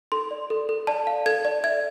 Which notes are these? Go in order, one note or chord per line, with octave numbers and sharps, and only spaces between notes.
A4 C6
D5
A4
A4
D5 A5
F5
A4 G#6
D5
E5 G#6